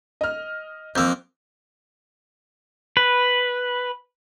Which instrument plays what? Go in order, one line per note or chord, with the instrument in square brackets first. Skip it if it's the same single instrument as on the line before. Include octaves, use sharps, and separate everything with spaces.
[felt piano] D#5 F6
[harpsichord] F2 A#3 [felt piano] E6 G6
[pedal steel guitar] B4